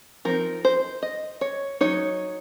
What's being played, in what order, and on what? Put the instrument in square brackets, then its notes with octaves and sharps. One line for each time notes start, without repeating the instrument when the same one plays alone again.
[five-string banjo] F3 C4 D#4 A#4
C5
D#5
C#5
F#3 A#3 D#4 C#5